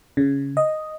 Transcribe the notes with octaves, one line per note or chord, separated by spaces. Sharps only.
C#3
D#5